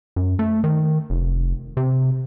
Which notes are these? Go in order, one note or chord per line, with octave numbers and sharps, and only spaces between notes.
F#2
A3
D#3
F1
C3